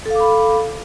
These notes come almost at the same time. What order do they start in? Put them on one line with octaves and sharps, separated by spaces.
A4 F5 D6 B5